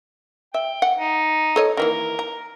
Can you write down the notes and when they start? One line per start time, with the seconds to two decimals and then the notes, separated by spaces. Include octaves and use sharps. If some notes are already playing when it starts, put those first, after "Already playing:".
0.54 E5 G5
0.82 F#5
0.97 D#4
1.56 A4 C#5 D#5
1.77 D#3 E3 A#3 A#4
2.19 A#5